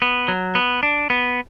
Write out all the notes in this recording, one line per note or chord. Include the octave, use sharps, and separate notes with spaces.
B3
F#3
B3
D4
B3